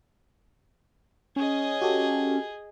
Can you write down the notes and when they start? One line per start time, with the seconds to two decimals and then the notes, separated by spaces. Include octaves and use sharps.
1.36 C#4 G#4 D#5
1.82 F#4 G4 A4